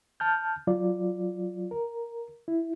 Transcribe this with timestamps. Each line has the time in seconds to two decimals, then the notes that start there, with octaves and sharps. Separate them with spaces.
0.20 A5 F6 G6
0.67 F#3 F4 D5
1.71 A#4
2.48 E4